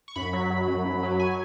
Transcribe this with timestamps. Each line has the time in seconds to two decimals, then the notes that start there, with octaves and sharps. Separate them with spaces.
0.08 C#6
0.16 F#2 B5
0.33 F#3
0.50 F#3
0.68 F#2
0.85 F#2
1.03 F#3
1.20 G#5